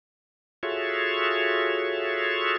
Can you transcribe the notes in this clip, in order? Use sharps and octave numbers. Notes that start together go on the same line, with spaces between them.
F4 F#4 G#4 A4 C#5 E5